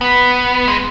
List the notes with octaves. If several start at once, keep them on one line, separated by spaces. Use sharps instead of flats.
B3
G#3